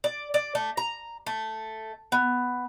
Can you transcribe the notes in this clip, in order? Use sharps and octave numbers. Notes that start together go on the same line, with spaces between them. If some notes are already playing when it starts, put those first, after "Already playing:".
D5
D5
A3
A#5
A3
B3